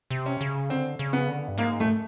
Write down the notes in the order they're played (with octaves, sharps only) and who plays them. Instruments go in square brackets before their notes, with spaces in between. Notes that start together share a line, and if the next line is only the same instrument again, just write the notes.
[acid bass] C3
[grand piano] C#4
[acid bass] C#3
[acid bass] D3 [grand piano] C4
[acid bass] C#3
[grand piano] B3
[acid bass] D3
G2
[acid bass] G#2 [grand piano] A#3
[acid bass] A2 [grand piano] A3